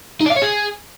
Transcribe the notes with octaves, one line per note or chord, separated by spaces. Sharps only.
D#4
D5
F5
C#5
G#4